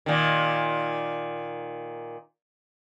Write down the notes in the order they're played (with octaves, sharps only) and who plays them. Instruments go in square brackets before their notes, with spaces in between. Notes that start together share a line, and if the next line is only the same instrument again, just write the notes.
[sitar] A#2 D#3